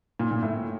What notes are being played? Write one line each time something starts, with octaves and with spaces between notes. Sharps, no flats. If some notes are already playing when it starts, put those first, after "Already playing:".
A#2
A#2
A2